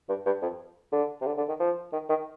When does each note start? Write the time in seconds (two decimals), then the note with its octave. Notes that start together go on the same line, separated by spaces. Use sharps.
0.09 G2
0.26 G2
0.42 F2
0.92 D3
1.21 C3
1.26 D3
1.37 D3
1.49 D#3
1.60 F3
1.93 D#3
2.09 D#3